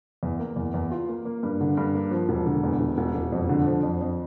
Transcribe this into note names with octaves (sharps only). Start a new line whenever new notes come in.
E2
A#3
E2
E2
F4
A#3
A#3
G2
D3
G2
A#3
F3
E1
D3
E2
E1
E1
E1
F2
D3
F3
F2
F2